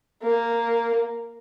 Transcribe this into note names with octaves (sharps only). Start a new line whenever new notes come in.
A#3